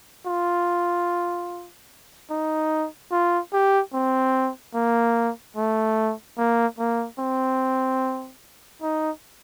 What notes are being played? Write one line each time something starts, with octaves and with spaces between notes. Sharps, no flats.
F4
D#4
F4
G4
C4
A#3
A3
A#3
A#3
C4
D#4